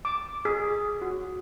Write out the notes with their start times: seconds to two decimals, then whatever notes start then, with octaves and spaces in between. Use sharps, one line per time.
0.05 D6
0.45 G#4
1.02 F#4